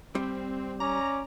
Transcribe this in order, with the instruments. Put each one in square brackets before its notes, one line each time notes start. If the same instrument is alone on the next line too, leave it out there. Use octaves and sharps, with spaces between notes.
[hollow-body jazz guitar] G3 [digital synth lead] C4
[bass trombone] C#4 [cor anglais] D5 [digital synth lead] A#5